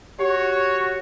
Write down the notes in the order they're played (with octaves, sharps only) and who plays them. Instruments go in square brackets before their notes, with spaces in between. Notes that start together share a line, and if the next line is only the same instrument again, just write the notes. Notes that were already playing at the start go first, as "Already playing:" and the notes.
[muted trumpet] F#4 [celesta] G4 [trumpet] C#5